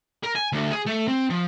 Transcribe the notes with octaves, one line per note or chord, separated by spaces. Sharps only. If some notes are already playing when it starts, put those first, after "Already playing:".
A#4
G#5
D2
G#4
A3
C4
F3